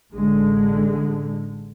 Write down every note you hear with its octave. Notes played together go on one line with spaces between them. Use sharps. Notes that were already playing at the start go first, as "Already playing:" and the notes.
A1 D3 G#3